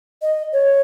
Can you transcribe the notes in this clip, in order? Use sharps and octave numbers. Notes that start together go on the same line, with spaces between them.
D#5
C#5